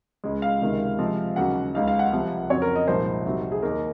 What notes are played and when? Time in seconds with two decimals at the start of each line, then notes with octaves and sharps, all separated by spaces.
0.24 C#2 C#3 G#3
0.42 F5
0.62 C#2 C3 D#3 G#3
0.99 C3 F3 G#3 C4
1.36 D#2 C#3 F#3 F#5
1.74 C#2 C#3 G#3 D#4 F5
1.88 F5
1.99 F#5
2.12 C2 C3 F3
2.50 F2 C#3 F#3 C4 C#5
2.62 A#4
2.76 D#5
2.87 C2 A#2 F3 G#3 D#4 C5
3.26 C2 C3 F#3 C4 D#4
3.52 G#4
3.62 D#2 D#3 A#3 A#4